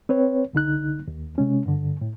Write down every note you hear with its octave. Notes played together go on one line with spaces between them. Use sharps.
C4 B4 C#5
C2 D3 D#4 F#6
D#2
C3 G#3 C#4
G2 D3
A2